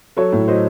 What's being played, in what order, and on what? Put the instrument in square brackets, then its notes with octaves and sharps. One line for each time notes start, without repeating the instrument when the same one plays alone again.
[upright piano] F#3 A4 C#5
A2
F#3 C5 D#5